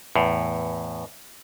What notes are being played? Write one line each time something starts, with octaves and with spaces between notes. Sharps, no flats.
E2 A2